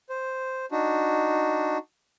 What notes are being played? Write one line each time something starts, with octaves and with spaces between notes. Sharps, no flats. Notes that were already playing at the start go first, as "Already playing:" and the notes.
C5
D4 D#4 F#4